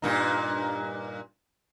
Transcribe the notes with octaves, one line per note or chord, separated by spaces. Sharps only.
G2 A#2 D#4